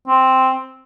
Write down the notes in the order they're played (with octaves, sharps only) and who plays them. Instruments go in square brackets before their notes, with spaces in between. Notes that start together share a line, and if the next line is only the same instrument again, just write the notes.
[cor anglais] C4